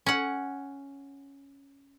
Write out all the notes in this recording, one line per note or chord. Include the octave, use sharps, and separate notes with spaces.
C#4 F#5